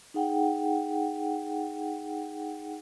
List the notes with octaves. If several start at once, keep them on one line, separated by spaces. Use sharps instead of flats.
D#4 G#4 F#5 G5